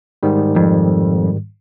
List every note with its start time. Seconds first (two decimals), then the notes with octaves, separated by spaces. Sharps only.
0.23 G#2 D#3 G3
0.56 F2